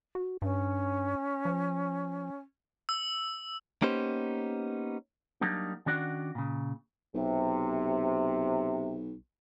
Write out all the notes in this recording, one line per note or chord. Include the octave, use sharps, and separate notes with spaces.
F#4
G2 C#4
F3
E6
A#3 B3 C#4 D#4 G4 C5
F#3 G3 A#3 D4 D#4
D#3 C#4 D4 F#4 D5 F#5
A#2 C#3
B1 C3